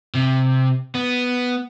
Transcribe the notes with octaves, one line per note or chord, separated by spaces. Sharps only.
C3
B3